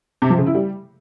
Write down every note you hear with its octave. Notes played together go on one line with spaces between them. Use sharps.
C3
F3
C#3
E4
G3